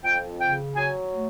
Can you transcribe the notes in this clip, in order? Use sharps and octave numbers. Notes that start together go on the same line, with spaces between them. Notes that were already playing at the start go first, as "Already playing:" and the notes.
F2 G5
C#3 G5
F#3 G#5
A3